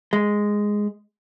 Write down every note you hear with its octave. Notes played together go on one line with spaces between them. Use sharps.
G#3